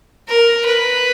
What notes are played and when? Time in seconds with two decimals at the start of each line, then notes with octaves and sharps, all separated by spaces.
0.29 A#4
0.66 B4